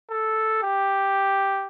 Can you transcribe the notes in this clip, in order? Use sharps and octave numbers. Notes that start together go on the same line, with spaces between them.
A4
G4